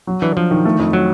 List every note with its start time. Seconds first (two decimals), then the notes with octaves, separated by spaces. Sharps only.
0.07 F#3
0.22 E3 D4
0.37 F3 D4
0.51 D#3
0.65 A3
0.79 F2
0.93 F#3